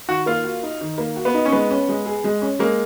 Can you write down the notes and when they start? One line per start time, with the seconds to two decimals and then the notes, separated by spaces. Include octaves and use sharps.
0.08 D#3 F#4
0.26 A#3 F4
0.44 F#4
0.63 D#4
0.81 D#3
0.98 A#3
1.16 F#4
1.25 B3
1.34 D#4
1.46 C#4
1.52 G#3 B3
1.70 C#4
1.89 G#3
2.06 G#4
2.24 G#3
2.42 C#4
2.59 G#3 A#3